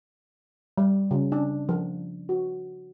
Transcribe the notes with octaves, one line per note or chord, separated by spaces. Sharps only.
G3
C#3
D4
F3
F#4